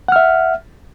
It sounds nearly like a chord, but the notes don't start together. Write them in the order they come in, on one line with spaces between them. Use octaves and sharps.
F#5 F6 E5